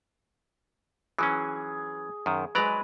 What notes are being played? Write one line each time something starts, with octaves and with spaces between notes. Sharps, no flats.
E3 F#3 C#4 G#4
F#2 D#3
F#3 G#3 B4 D5 A#5